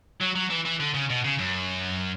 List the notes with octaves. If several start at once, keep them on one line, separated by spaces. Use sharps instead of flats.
F#3
F#3
E3
E3
D3
C#3
B2
C#3
F#2